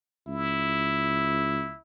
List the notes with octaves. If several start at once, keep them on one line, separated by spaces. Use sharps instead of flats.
C#2 E4